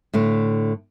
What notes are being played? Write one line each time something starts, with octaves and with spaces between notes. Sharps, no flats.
A2 D3 A3